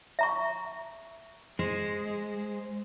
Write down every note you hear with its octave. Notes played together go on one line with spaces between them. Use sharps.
E5 A#5 C#6
G#3 C5